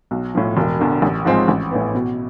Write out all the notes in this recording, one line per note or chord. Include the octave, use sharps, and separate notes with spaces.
B1
A2 F3
E1
E2 D3
A1
G#2 F3 G#3 C4
A1
A2 E3 B3
B2